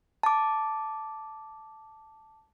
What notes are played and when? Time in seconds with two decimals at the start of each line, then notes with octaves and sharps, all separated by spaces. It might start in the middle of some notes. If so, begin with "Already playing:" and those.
0.23 A5 D6